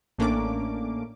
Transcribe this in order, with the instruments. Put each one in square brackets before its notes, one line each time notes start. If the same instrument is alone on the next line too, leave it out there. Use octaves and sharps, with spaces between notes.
[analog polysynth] A1 A2 A#3 C#4 D4 D6